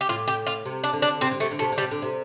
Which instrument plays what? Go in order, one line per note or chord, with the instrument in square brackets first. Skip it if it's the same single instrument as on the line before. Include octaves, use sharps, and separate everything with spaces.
[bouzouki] G4
[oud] A2 [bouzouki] F4
[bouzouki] G4
F4
[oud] C3
[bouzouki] D4
[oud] D3
[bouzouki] D4
[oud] C3 [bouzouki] C4
[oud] D3
[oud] C3 [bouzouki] A3
[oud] D3
[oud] C3 [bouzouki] A3
[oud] D3
[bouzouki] G3
[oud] C3
D3
C3